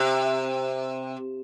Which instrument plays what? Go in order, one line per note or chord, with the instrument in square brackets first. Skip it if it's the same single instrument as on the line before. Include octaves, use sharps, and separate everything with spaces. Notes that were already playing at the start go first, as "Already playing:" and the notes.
Already playing: [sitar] C3